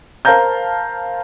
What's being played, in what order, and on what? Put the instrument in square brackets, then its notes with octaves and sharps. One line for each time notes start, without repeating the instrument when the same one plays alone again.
[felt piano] A#4 C5 F5 A5 A#5 G6